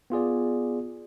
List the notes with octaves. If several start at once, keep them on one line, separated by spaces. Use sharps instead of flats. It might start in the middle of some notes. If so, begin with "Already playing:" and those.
B3 F4 G#4 D5